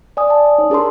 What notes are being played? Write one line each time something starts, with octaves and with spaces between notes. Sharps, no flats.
D5 G#5 D#6
A5
D#4 C#5
D4 G#4 A#4 A#5 C6